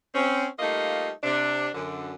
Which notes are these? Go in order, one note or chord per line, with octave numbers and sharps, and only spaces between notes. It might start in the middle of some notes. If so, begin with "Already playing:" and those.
C4 C#4
G3 A3 A#3 D#4 F4 D#5
C3 D4
F#2 D3